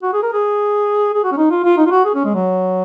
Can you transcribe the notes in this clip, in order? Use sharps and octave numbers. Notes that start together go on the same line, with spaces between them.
F#4
G#4
A#4
G#4
G#4
F#4
C#4
D#4
F4
F4
D#4
F4
F#4
G#4
C#4
G#3
F#3